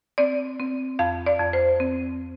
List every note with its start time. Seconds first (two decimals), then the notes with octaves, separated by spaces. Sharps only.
0.18 C4 D5
0.59 C4
0.99 F2 F5
1.26 D5
1.39 F2
1.53 C5
1.80 C4